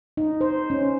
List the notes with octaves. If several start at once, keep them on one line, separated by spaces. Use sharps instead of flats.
D#4
C5
C#4